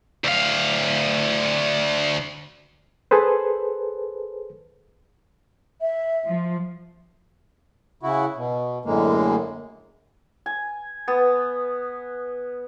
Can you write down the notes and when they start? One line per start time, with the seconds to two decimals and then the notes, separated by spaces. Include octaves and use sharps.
0.24 D2 F5
3.11 G#4 A4 B4 C5
5.81 E5
6.26 F3
8.03 C#3 E4 F#4
8.37 B2
8.85 F#2 A2 D3 G#3 A#3
10.46 G#5
11.08 B3